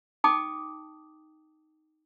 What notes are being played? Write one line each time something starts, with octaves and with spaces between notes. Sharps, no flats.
D#4 G5 A5 D6 D#6